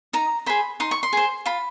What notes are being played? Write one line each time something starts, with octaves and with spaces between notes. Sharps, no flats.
D#4 A#5
G#4 C5 B5
D#4 C6
C#6
C6
G#4 C5
F4 B5